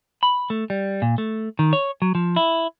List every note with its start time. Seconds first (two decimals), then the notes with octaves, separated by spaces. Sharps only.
0.23 B5
0.50 A3
0.70 G3
1.02 A#2
1.18 A3
1.59 D#3
1.73 C#5
2.02 F#3
2.15 F3
2.36 E4